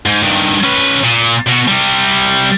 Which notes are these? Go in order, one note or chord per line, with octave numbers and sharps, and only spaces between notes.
G#2
G2 D#3
C#4 B4
A#2
B2 F#4
C3 G3